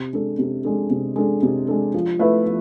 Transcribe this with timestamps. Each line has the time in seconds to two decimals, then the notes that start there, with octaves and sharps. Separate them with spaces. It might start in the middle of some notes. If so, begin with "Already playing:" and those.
Already playing: C3
0.13 G#3 D4 A4
0.39 C3
0.65 G#3 D4 A4
0.90 C3
1.16 G#3 D4 A4
1.43 C3
1.68 G#3 D4 A4
1.94 F3
2.19 A3 E4 B4 E5
2.46 F3